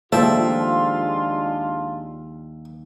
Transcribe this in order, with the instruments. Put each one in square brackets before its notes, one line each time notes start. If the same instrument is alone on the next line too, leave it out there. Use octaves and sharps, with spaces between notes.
[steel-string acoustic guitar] D#2 [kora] F3 A3 D5 [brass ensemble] G#3 D4 F4 [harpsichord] E5